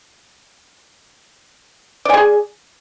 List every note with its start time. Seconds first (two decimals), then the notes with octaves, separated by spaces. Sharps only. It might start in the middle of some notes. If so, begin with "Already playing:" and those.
2.05 D5
2.10 G#5
2.14 G#4